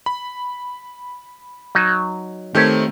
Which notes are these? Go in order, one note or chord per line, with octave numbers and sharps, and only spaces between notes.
B5
F#3 D#4
D#3 A3 C4 G4 C#5